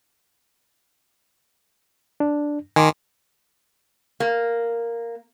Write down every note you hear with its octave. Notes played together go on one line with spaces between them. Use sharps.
D4
D#3 G#5 C6 D6
A#3